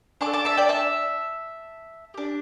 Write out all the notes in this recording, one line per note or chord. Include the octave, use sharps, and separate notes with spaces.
D4 A5 D6
A4
A5 D6
E5 A5
D5 G5
E5 A5
D4 G4